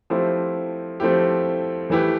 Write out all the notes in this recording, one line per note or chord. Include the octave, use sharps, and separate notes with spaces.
F3 A3 C4 E4 G4
F3 A3 C4 E4 G4
E3 A3 E4 G4 B4